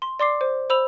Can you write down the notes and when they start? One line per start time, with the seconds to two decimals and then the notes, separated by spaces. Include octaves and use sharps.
0.02 C6
0.20 D5 C6 D6 C7
0.41 C5
0.70 C5 B5 E6 F7